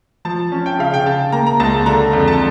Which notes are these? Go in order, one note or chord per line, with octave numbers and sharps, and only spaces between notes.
F3 A5
C#4
G5
C#3 F5
G5
C#3 A5
A#3 A#5
A#5
C#2 A5
D3 A#5
F2
A5